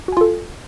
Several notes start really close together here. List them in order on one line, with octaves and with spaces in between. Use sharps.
F#4 G#5 F4 A4